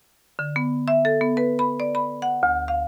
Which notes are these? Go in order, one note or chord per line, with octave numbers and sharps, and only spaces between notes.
D3
B3
E5
A4
B3
B4
B5
D5
B5
F#5
D2
F5